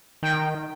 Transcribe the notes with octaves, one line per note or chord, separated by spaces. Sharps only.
D#3 G5